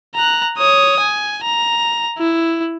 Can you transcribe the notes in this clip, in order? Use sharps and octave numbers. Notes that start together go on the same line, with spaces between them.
A#5 F#6
C#5 D#6
G#5
A#5
E4